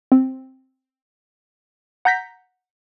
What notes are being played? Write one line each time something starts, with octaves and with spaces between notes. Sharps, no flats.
C4
F#5 A#5 G6 A#6 B6